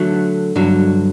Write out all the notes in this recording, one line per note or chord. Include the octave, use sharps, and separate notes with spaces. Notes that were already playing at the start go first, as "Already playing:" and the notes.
Already playing: D3 F#3 A3
G2 D3 F#3